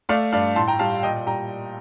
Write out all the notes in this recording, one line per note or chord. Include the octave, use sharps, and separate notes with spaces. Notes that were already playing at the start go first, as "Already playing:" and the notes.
A3 D5 F5
G2 D5 F5
A2 A5 C6
G5 A#5
G3 F5 A5
A#2 D#5 G5
G3 G5 A#5